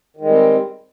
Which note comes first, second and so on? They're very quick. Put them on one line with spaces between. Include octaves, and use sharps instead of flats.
D#3 G#3 G3 C4